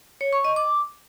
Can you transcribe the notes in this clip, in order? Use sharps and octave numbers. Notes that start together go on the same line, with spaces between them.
C#5
C#6
D#5
D6